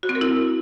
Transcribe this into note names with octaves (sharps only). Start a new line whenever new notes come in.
F#4
C4
A#4
E4